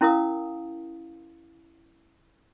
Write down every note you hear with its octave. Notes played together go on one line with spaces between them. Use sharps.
C#4 E4 A#4 F5 D#6